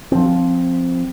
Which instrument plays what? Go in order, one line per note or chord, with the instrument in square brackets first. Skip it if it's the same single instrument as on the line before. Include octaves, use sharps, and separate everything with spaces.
[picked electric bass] F3 C4